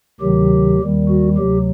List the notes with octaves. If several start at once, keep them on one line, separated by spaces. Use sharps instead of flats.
D2 C3 D#3 F#3 G4
D#2 D#3 G3
F#4
D2 C3 F#3 G4